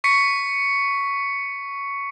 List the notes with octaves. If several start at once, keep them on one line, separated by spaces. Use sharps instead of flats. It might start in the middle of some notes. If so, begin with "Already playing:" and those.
C#6 B6 C#7